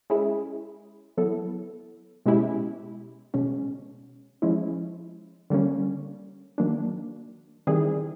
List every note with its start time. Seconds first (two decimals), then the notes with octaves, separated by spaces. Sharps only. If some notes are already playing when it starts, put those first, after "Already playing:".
0.10 G#3 C#4 E4 G#4
1.17 F#3 B3 E4 A4
2.26 B2 G#3 C#4 E4 G4
3.34 B2 G#3 C#4
4.42 F3 G#3 C#4 E4
5.50 D3 G3 A#3 C#4
6.58 D#3 F#3 A#3 D4
7.67 D#3 G3 C4 E4 G#4